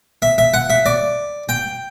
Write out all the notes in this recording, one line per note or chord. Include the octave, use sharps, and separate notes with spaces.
E5
E5
F#5
E5
D5
G5